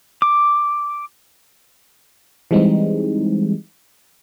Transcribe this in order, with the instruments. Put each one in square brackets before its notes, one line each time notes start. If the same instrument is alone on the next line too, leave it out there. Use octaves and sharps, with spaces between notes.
[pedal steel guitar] D6
[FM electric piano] E3 G3 G#3 C4 D#4